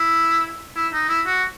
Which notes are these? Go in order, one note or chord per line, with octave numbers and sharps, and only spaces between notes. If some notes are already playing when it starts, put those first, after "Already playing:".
Already playing: E4
E4
D#4
E4
F#4